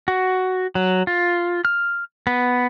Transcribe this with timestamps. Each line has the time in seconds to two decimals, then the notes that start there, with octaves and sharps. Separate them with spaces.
0.08 F#4
0.75 F#3
1.07 F4
1.65 F6
2.27 B3